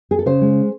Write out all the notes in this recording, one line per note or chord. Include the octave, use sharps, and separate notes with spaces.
G#4
A4
C#3 C5
G#3